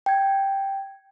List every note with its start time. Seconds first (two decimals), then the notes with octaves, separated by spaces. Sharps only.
0.06 G5 G#6